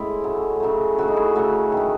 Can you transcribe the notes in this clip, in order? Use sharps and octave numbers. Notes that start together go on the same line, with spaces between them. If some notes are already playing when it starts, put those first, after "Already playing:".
Already playing: A2 G#3 C#4 E4
C#3 F#3 A3
C#3 F#3 A3
C#3 F#3 A3 F#4
D#4
E4
C#3 F#3 A3 F#4
D#3 A3